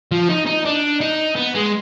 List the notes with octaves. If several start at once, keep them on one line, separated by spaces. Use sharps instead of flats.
F3
D#4
D#4
D4
D#4
B3
G#3